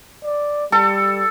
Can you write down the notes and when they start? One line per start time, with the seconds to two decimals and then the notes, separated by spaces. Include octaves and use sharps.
0.23 D5
0.72 G3 A4